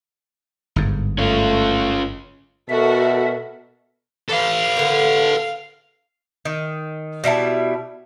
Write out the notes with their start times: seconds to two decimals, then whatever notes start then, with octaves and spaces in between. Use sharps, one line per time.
0.76 G1 G#2
1.18 A3 C#4 F4
2.69 B2 F#4 A4 A#4 E5
4.29 E3 A4 B4 F5
4.76 D3 A3 A#3
6.45 D#3
7.24 B2 G3 E4 A5